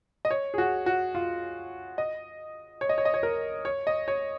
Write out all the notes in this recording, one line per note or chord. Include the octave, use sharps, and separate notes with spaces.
D#5
C#5
G#4
F#4
F#4
F4
D#5
C#5
D#5
C#5
D#5
C#5
A#4
C#5
D#5
C#5